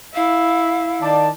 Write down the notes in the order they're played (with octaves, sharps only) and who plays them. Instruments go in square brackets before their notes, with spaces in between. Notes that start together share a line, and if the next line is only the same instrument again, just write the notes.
[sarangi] E4 [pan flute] F5
[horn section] D#3 D5 A5